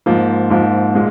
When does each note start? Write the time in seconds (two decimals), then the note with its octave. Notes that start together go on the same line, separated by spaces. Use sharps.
0.06 G#2 F3 A#3
0.50 G#2 F3 A#3
0.95 A#2 G#3